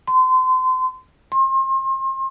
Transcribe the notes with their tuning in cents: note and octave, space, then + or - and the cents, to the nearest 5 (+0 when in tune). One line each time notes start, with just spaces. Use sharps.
C6 -30
C6 +35